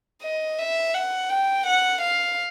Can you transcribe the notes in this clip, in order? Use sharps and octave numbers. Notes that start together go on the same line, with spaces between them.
D#5
E5
F#5
G5
F#5
F5